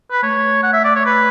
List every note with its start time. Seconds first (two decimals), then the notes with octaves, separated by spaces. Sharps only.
0.11 B4
0.22 A3 C#5
0.63 F#5
0.73 E5
0.84 D5
0.95 C#5
1.06 B4